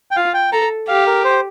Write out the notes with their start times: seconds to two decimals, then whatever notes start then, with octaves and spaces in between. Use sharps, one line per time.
0.11 G5
0.16 F4 F5
0.34 G5
0.52 A4 A#5
0.88 G4 F5
1.06 A#4
1.24 C5